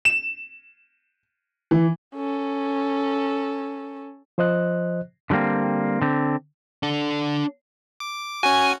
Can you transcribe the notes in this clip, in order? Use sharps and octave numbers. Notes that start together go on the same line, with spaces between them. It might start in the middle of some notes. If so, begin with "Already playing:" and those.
E7
E3
C#4 A4
F3 C5 D#5 F#6
D3 F#3 G3 A#3 C4
D3 C4
D4 A4
D6
C#4 F#4 G#5